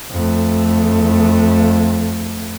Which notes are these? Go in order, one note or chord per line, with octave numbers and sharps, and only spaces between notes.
F2 A3